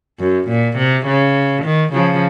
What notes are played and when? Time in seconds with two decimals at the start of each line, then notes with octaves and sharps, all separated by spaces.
0.20 F#2
0.49 A#2
0.77 C3
1.07 C#3
1.65 D#3
1.93 C#3 F3